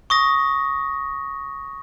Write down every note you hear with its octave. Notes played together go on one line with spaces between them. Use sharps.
C#6 D#6 A#6